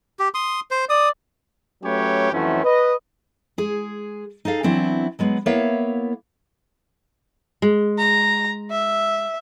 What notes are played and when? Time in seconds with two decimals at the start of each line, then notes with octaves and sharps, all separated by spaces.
0.19 G4
0.34 C6 D#6
0.71 C5
0.90 D5 D#6
1.83 F#3 A3 C#4 G4 B4 C#5
2.32 F2 E3 F#3 A3 C4 C#4
2.64 B4 D#5
3.58 G#3 G#4
4.45 D#4 G#4 A4 F5
4.63 E3 F#3 B3 C4 D4 E4
5.19 F#3 G#3 B3
5.46 A#3 B3 E4 C#5 E5 F5
7.62 G#3
7.98 A#5
8.71 E5